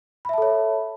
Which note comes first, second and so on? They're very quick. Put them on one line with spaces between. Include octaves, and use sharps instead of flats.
B5 E5 A5 A4 C#5